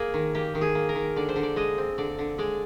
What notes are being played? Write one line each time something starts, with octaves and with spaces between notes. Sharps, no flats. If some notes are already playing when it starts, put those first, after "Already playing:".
Already playing: A#3 G#4 A#4
D#3
A#3 G4
D#3
G#4
A#3
A#4
D#3
D3 D5
C5
D3
D5
G#3 D#5
C4
D3 D5
D3
G#3 D5